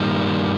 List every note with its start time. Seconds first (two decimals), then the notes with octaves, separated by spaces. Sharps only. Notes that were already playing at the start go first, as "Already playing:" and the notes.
Already playing: G2 D#3 G3 A#3